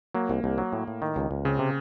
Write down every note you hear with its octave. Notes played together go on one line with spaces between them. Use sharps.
F#3 A#3
C2
C2
F#3
A2
A2
D#3
C#2
C#2
C#3 C4
C3